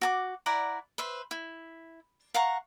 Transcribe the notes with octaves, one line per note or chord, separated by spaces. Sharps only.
F#4 A5 D6
E4 D5 F#5 A#5
B4 C5 E5
E4
F5 F#5 A#5 C#6